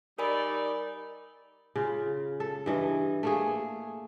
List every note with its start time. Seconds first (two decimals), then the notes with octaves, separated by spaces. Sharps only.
0.19 G3 D#4 A#4 D5 G#5 B5
1.76 C#3 F4
2.40 A4
2.66 G2 E3 D#5
3.23 A3 A#3 G#4